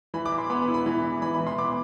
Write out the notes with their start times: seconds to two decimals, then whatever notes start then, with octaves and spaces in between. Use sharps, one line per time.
0.14 E3 B5
0.26 D6
0.32 E4
0.38 C6
0.50 B3 B5
0.62 B5
0.68 E4
0.74 B5
0.86 E3
1.04 E4
1.22 E3 B5
1.34 B5
1.40 E3
1.47 C6
1.58 B3 D6